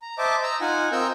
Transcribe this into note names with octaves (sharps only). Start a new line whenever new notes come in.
A#5
C5 D#5 E5 A5 D6
D#5 A#5 E6
D#4 F4 F#5 G#5
C4 F4 A#4 D#5 E6 G6